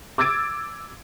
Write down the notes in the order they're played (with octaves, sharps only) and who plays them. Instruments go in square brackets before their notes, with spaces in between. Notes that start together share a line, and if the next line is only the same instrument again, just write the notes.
[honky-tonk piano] D6 E6 G#6 A6 D7